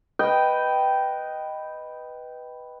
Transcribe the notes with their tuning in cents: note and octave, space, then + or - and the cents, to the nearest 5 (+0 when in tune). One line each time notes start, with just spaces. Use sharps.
B4 +0 D#5 +0 G5 -10